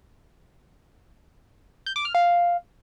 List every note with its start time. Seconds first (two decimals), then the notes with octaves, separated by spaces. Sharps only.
1.86 G6
1.96 D6
2.05 F6
2.15 F5